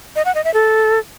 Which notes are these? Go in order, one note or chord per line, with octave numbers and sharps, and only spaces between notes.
D#5
F#5
D#5
E5
A4